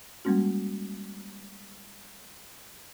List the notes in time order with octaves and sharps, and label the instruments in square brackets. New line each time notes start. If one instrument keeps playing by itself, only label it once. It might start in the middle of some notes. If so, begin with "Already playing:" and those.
[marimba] G3 G#3 A#3 C#4 F#4